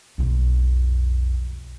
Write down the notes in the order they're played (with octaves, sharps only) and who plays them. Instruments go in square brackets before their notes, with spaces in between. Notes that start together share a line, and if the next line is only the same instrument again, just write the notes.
[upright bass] B1 F2